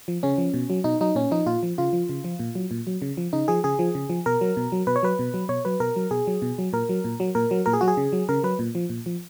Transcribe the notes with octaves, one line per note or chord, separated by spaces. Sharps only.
F3
C#3 C#4
F3
B2
F#3
B2 D#4
F#3 D#4
A#2 C#4
F3 D#4
A#2 F4
F3
C#3 F4
F3
C#3
F3
A#2
F#3
A#2
F#3
C#3
F3
C#3 D#4
F3 G#4
C#3 G#4
F3
C#3
F3
B2 A#4
F#3
B2
F#3
B2 B4
C#5
F#3 B4
B2
F#3
B2 C#5
F#3 B4
B2 A#4
F#3
B2 G#4
F#3
B2
F#3
A#2 A#4
F#3
A#2
F#3
A#2 A#4
F#3
A#2 A#4
G#4
F#3 F#4
G#4
C#3
F#3
C#3 A#4
F#3 B4
A#2
F3
A#2
F3